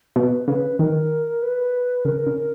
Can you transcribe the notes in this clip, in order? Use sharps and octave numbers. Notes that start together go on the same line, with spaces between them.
B2 B4
C#3 B4
D#3 A#4
B4
C#3 A#4
C#3